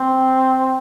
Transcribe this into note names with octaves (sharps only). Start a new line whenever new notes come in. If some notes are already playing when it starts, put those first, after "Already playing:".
Already playing: C4